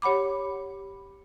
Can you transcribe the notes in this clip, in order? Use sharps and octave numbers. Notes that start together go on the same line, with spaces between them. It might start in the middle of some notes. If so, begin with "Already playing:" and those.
G4 C#5 F#5 B5 D6